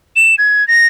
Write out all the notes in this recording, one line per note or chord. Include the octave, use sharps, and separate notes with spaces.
E7
G#6
A#6